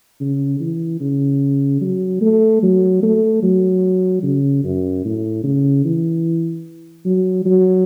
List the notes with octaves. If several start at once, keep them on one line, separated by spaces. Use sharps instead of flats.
C#3
E3
C#3
F#3
A3
F#3
A3
F#3
C#3
F#2
A2
C#3
E3
F#3
F#3